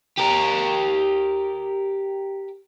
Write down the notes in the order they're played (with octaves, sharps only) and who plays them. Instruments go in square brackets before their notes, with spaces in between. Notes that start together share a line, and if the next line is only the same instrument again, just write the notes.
[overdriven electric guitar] G4 A#4